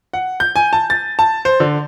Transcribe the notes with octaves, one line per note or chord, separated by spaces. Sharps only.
F#5
G6
G#5
A5
A6
A5
C5
D3